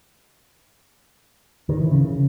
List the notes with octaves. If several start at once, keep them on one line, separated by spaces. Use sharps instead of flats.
D#3
E3
C#3